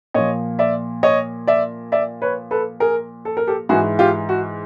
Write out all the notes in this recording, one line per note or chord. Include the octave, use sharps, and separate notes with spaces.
A#2 F3 C#5 D#5
D5 E5
C#5 D#5
D5 E5
D5 E5
B4 C#5
A4 B4
G#4 A#4
A4
A#4
G4 A4
G#2 E3 F#4 G#4
F4 G4
F#4